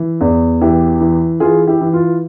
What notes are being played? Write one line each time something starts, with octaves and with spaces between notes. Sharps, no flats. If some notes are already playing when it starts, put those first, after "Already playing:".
Already playing: E3
E2
E3 E4 G4
E3
E3 F4 G#4
E4 G4
E3
F4